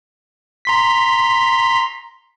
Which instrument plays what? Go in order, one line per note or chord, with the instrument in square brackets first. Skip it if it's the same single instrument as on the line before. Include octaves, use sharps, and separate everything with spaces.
[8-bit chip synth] A#5 C6 B6